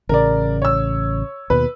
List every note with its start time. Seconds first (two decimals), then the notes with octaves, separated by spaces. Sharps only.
0.09 A1 C#3 A#4 D5
0.62 C#5 E6
1.50 D#2 B2 B4